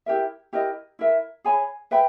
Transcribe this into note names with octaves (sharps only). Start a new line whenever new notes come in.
E4 G4 A#4 E5
E4 G4 A#4 D#5
E4 A#4 E5
G#4 C#5 G#5 B5
B4 E5 G5 B5